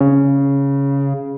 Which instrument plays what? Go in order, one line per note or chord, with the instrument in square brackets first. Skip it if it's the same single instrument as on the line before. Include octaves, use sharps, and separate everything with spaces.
[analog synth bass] C#3 [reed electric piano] C#4